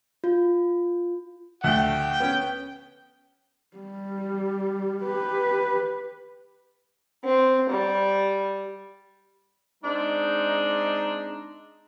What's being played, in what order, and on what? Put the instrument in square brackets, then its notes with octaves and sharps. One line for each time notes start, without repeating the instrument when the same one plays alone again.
[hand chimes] F4
[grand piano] D2 A3 [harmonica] G5
[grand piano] B3 C#4
[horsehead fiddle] G3
G4 B4
[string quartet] C4
G3
[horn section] G#3 C4 D4 D#4